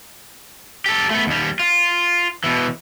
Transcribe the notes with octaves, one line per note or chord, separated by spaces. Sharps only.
G4 A4
A3 B3
D#2 G3
F4
B2 E3